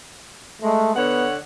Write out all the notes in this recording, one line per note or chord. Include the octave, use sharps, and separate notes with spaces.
G#3 A3
D3 B3 C#5 F#5